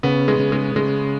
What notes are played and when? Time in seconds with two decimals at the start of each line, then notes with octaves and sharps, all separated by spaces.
0.03 C#3 B3
0.28 G#3
0.39 C#3
0.52 G#3
0.76 C#3 G#3